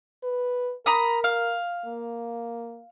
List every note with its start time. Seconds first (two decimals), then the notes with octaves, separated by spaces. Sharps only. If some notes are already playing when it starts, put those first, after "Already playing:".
0.24 B4
0.86 A#4 A#5 B5 D#6
1.24 F5
1.86 A#3